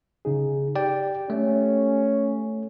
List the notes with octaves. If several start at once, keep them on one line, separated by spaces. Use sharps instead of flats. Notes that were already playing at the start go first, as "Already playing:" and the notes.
C#3 D#4 G#4
G4 D5 G5
A3 C#4